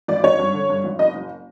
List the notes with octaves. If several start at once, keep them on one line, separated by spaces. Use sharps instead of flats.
G#1 D5
G#1 C#5
G2
D3
G2
G#1
F#1 D#5
F#1